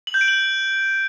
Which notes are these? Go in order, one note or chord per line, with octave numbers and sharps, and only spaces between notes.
F#7
G6
D7
F#7